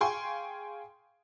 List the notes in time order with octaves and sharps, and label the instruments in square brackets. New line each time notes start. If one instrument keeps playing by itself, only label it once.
[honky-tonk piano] G#4 F5 G5 G#5 C6 C#6